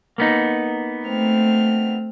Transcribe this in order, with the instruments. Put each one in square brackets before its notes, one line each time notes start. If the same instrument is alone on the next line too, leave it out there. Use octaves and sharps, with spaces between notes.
[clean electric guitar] A#3 B3 D#4
[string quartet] A3 C4 F6